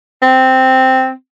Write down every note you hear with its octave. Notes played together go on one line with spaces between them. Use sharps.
C4